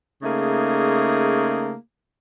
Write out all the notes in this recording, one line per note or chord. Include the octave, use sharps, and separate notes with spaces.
C#3 A3 A#3 D#4 G#4